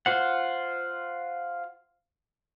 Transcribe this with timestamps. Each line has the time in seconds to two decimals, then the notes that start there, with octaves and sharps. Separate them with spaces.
0.06 F4 C5 F#5